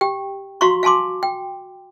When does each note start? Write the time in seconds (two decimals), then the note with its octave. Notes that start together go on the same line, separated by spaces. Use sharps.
0.01 G4 G5
0.61 F#4 F5 A#5 C6 C#6
0.83 F5 G#5 A5 C6 D6
1.23 G5